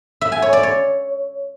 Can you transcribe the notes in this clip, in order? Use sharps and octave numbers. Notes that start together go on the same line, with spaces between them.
E5
G#5
C#5
D5
C#5